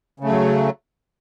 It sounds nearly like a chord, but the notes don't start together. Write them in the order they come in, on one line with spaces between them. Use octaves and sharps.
C#3 A3 F#3